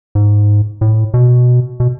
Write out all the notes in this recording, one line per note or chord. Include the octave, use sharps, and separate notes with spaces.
G#2
A2
B2
B2